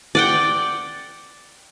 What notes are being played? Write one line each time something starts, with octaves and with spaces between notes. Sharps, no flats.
D5 F#5 G5